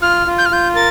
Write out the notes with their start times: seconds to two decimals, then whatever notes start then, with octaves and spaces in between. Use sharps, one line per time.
0.02 F4 F6
0.26 F4
0.38 G6
0.46 F6
0.51 F4 G6
0.75 A#4 A6